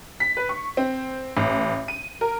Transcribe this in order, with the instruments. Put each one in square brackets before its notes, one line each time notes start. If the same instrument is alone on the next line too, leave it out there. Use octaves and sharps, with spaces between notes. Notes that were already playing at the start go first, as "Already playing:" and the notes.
[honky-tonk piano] B6
B4
C#6
C4
A1
D#7
A#4